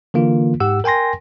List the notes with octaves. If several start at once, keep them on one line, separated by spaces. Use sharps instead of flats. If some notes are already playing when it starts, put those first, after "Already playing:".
D3 E3 A#3 F4
G#2 G4 F#5 E6
A#4 G5 G#5 C6 A#6